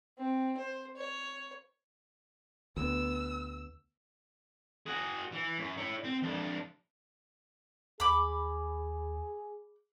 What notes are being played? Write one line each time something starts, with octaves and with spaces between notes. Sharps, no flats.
C4
C5
C#5
D2 B3 E6
F#4 G#4
E3
F#2
E4 C#5
C4
F2 D4
D#2 G#4 B5 D6